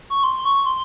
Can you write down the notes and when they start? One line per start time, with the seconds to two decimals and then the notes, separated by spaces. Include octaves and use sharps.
0.10 C#6
0.24 C6
0.45 C#6
0.65 C6